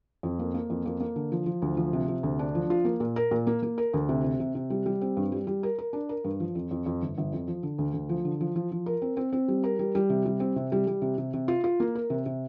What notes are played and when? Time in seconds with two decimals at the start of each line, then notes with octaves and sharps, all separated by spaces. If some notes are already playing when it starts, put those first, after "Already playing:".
0.23 F2
0.39 A#3
0.54 A#3
0.70 F2
0.86 A#3
1.00 A#3
1.16 D3
1.32 F3
1.46 F3
1.62 D2
1.77 F3
1.93 C3
2.08 C3
2.23 D2
2.39 D4
2.55 F3
2.70 F4
2.85 A#3
3.00 A#2
3.16 A#4
3.31 A#2
3.47 A#3
3.63 A#3
3.78 A#4
3.94 D2
4.09 C3
4.24 C3
4.40 C3
4.55 C3
4.70 G3
4.86 G3
5.01 C4
5.17 G2
5.32 G3
5.47 G3
5.63 A#4
5.79 A#4
5.93 D4
6.09 A#4
6.24 G2
6.40 F3
6.55 F2
6.71 F2
6.86 F2
7.02 G1
7.18 G1
7.33 F2
7.48 F3
7.63 D3
7.78 D2
7.94 D2
8.09 F3
8.25 D3
8.41 F3
8.56 F3
8.72 F3
8.86 A#4
9.02 C4
9.17 C4
9.33 C4
9.48 G3
9.64 A#4
9.79 G3
9.95 G3
10.10 C3
10.25 G3
10.40 C4
10.56 C3
10.72 G3
10.87 G3
11.02 C3
11.18 C3
11.34 C3
11.48 F4
11.64 F4
11.80 A#3
11.95 A#4
12.10 C3
12.26 C3